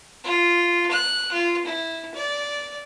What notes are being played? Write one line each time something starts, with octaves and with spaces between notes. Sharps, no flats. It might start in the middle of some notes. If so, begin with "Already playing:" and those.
F4
F#6
F4
E4
D5